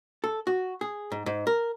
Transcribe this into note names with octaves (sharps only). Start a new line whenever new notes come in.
A4
F#4
G#4
G#2
G#2
A#4